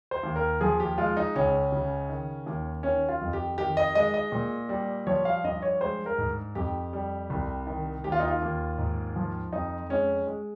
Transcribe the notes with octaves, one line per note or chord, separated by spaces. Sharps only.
C5
D#2
A#4
F3 G#4
G4
G#3 F4
D#4
C#2 C#4
C#3
D#3
D#2
D#3 C#4
F4
F2
G4
D#3 G4
D#5
G#3 D#5
D#5
A#2
G3
F3 C#5
F5
G2 D#5
C#5
G#3 C5
A#4
G#2
F2 G4
G3
C2
D#3
D#2 G4
F4
D#4
F4
D#2
G#2
F3
F2 D#4
G#3 C#4
G#3